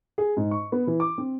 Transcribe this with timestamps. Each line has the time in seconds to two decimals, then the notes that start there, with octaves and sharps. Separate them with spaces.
0.18 G#4
0.37 G#2
0.51 C#6
0.72 B3
0.87 E3
1.00 D6
1.18 C4